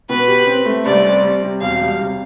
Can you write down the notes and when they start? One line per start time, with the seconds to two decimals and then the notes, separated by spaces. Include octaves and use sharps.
0.09 B2 B4
0.28 G4
0.47 C4
0.66 A3
0.85 C2 D5
1.05 C4
1.23 G3
1.42 C3
1.61 E1 F5
1.80 G3
1.99 C3